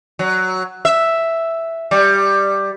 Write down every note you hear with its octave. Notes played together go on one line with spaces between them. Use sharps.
F#3
E5
G3